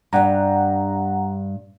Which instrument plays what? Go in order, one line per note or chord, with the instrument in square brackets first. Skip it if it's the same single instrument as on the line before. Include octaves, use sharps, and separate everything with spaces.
[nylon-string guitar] G2 G3 [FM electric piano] F#5 A#5